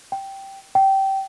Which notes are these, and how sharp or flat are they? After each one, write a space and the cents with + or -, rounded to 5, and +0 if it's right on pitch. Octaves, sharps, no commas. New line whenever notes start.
G5 -5
G5 -20